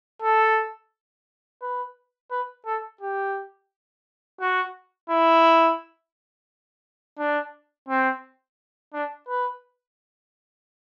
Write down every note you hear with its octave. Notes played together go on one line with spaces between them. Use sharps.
A4
B4
B4
A4
G4
F#4
E4
D4
C4
D4
B4